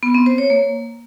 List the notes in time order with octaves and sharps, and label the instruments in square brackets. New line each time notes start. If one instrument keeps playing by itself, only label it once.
[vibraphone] B3
C4
C5
C#5
A#3